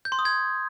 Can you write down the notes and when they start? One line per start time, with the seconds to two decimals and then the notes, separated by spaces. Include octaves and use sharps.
0.05 G6
0.12 C6
0.19 D#6
0.25 G#6